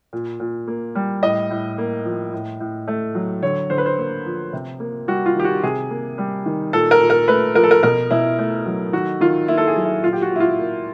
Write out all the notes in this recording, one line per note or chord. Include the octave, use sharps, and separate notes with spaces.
A#2
A#2
A#3
G3
A2 D#5
A2
A#3
F3
A2
A2
A3
F#3
D3 C#5
D3 C5
B4
C5
A#3
F3
C3
A#3
G3 F#4
F4
D#3 G4
F#4
C3 G#4
A#3
G3
D#3
A#2 A4
A#4
A#2
A#4
A3 B4
F3 A#4
A4
A#4
B2 A#4
B2 E4
A3
F#3
D#3 F#4
D#3 F4
A#3 E4
A4
G#4
F#3
E4
A#2 F4
G4
F#4
A#2 E4
F4
A#3